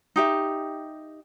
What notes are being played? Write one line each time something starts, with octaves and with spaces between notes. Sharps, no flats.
D#4 G4 E5